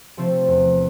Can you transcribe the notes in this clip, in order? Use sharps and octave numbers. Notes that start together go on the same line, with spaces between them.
C3 F3 A3 C4
E2